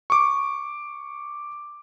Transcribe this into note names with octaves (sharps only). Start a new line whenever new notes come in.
C#6 D6